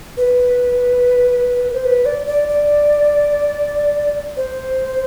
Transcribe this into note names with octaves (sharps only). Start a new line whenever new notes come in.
B4
C5
B4
D5
D5
D5
C5